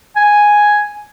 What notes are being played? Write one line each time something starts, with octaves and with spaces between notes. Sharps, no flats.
G#5